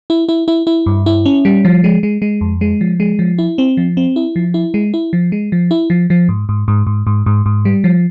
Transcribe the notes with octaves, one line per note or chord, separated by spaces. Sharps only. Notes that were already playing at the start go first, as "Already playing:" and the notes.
E4
E4
E4
E4
G2
E4
C#4
G3
F3
G#3
G#3
G#3
F2
G#3
F3
G#3
F3
E4
C4
F3
C4
E4
F3
E4
G#3
E4
F3
G#3
F3
E4
F3
F3
G#2
G#2
G#2
G#2
G#2
G#2
G#2
G3
F3